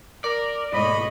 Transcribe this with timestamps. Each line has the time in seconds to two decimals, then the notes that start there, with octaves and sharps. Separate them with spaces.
0.24 A#4 D5
0.73 G#2 B2 A3 C#5 D#5 B5